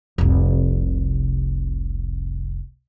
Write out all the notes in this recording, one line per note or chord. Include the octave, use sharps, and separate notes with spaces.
F1 C2